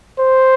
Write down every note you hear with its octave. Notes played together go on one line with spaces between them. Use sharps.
C5